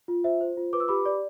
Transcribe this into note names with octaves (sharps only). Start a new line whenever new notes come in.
F4
C5 E5
C5
F4
B4 D6
E6
G4 B5 D6
D5